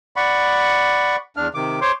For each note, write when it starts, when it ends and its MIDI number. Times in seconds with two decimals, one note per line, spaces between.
0.16 1.16 74
0.16 1.16 78
0.16 1.16 83
0.16 1.16 85
1.37 1.48 40
1.37 1.48 62
1.37 1.48 89
1.55 1.80 48
1.55 1.80 51
1.55 1.80 86
1.82 1.92 72
1.82 1.92 73
1.82 1.92 84
1.82 1.92 86